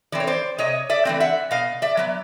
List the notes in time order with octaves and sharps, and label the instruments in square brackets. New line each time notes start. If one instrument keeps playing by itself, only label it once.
[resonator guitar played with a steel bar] E3 A3 C4 D5
C#5
C5 D5
C3 C#5 D#5
D5 E5
E3 A3 C4
E5 F#5
B2 D#5 F5
D5 E5
F#3 B3